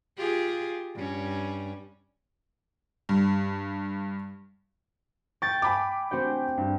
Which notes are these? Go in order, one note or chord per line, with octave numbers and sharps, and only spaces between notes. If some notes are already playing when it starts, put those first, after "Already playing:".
F4 G4 G#4
G2 C#4
G2
G5 C#6 A6 D7
G#5 B5 D6
C4 F#4 G5
G2